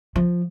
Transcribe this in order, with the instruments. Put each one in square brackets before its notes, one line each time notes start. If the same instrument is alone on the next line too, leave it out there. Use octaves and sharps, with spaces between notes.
[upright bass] F3